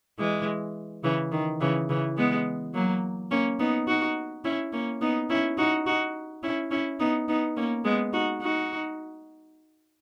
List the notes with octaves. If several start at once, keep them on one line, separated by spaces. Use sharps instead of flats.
E3 G#3
C#3 E3
D#3
C#3 E3
C#3 E3
G#3 B3
F#3 A#3
A#3 C#4
B3 D#4
D#4 F#4
C#4 E4
A#3 C#4
B3 D#4
C#4 E4
D#4 F#4
D#4 F#4
C#4 E4
C#4 E4
B3 D#4
B3 D#4
A#3 C#4
G#3 B3
D#4 F#4
D#4 F#4